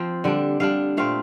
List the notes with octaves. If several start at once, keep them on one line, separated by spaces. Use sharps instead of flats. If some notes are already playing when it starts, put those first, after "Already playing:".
Already playing: F3 C4
D3 G3 D4
D3 G3 D4 F5
A#2 A3 C4 F5